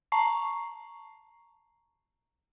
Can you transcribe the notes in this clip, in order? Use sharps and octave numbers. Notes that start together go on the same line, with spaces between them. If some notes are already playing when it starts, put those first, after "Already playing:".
A5 A#5 C#6 C7